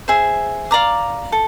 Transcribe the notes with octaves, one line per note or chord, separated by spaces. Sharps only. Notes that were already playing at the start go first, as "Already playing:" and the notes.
G#4 C5 E5
D5 F5 A#5 D6
A4